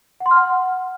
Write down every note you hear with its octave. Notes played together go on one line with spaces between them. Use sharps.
F#5
C6
F6
F#5